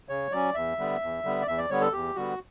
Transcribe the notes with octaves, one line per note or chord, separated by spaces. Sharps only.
C#3 C#5
F#3 C#4 D5
E2 E5
D3 G3 B3
E2
D3 G3 B3
D5
E2 E5
D5
D3 G3 B3 C#5
A4
E2 G4
D3 G3 B3 F#4